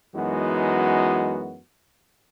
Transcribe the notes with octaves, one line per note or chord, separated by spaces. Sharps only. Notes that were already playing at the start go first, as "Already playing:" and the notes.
F#2 E3 G#3 B3 D#4 F#4